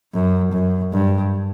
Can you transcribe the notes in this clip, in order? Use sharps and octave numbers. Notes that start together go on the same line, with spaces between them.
F#2
F#2
G2